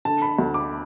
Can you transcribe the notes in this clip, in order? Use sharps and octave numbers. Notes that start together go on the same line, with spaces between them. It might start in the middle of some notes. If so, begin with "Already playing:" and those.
D3 A5
B5
D2
D6